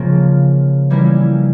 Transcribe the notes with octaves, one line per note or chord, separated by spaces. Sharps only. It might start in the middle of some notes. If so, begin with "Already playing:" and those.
Already playing: C#3 F3 A#3
E3 G3 A#3 C#4 E4